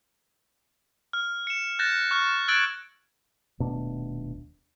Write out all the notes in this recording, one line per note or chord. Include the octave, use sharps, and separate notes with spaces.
F6
C#7 E7
F#6 G6 A6 A#6 E7
C#6 F6
E6 F#6 G#6 A6 D7 F#7
D#1 B2 A3 D4